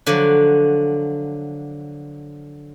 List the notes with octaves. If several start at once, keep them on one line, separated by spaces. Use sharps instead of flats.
D3 F3 F#3